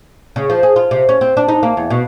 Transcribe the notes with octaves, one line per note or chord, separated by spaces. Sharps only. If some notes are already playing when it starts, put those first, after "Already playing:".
C#3
F3
G#4
F4
C3
C#4
C4
D4
D#4
A#3
E2
B2